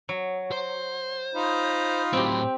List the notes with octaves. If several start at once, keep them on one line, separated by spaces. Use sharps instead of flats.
F#3
C5
D#4 F4 B5
A2 F#3 C4 G4